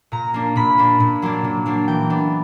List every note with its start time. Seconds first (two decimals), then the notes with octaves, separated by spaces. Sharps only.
0.12 A#2 A#5
0.34 A#3 D4
0.56 A#2 B5
0.78 A#3 D4
1.00 A#2
1.22 F#3 A#3 D4
1.44 A#2
1.66 F#3 A#3 D4
1.88 E3 G5
2.10 B3 D4